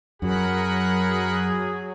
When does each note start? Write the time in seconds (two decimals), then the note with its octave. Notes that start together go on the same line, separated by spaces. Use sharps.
0.22 F#2 F#3 G#4 A#4 F#5 B5